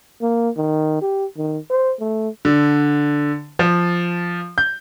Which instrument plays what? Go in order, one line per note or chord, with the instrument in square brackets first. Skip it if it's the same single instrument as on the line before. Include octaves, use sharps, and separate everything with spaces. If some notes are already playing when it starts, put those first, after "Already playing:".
[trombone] A#3
D#3
G4
D#3
C5
A3
[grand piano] D3
F3
G6